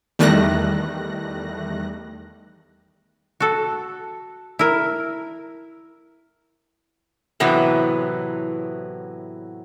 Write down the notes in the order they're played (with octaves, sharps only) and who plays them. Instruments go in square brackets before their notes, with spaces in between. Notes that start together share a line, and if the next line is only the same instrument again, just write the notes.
[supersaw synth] E2 D#3 G3 A3 F#6 A#6
[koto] F#4 A4
E4 A#4
[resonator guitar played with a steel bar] A2 C3 E3 F#3 B3